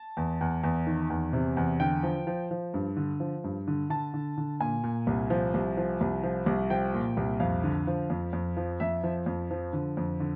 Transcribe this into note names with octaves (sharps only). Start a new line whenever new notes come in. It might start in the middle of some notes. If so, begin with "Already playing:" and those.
Already playing: A5
E2
E2
E2
D#3
E2
C3
E2
D3 G5
F3
F3
F3
G2
D3
F3
G2
D3
D3 A5
D3
D3
A#2 G#5
A#2
C2
F3
C2
F3
C2
F3
C2
F3 G5
A#2
C2
F2 F5
D3
F3
F2
F2
F3
F2 E5
F3
F2
F3
D3
F2
D3